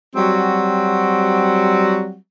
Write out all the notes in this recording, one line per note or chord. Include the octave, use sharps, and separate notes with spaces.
F#3 G3 C4 F#4